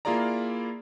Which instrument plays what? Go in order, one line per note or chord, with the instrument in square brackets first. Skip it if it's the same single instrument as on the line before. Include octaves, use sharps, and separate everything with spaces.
[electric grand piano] A#3 E4 F4 G#4 D5 A#5